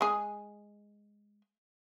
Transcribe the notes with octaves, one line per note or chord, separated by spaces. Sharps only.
G#3 G#4